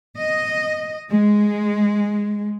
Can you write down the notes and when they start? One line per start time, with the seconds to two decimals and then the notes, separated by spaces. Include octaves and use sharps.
0.17 D#5
1.10 G#3